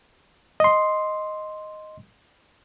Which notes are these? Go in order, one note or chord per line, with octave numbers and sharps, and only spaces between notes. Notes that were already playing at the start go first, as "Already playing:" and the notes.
D#5 C6